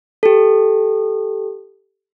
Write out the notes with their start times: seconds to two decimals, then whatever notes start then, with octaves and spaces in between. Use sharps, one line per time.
0.23 G4 A4